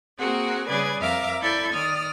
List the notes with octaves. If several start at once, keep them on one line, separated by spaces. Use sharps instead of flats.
A#3 C4 F#4 G#4 A#4 F#5
C#3 G3 G#4 B4 D5 G#6
F2 A#4 E5 F5 A#5 D6
E4 A4 D5 B5 G6 G#6
D#3 D5 D#6 F6